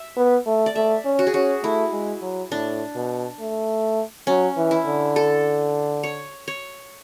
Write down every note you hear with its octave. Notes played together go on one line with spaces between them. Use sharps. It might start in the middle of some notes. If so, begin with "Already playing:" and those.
Already playing: E5
B3
A3
D5
A3 E5
C#4
F#4
G#4
C#4 F#4
A3 E4
G#3
F#3
A2 D4
B2
A3
F#3 C#4
E3
E4
D3
A4
C#5
C#5